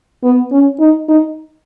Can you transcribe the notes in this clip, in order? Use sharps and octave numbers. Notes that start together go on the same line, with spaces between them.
B3
C#4
D#4
D#4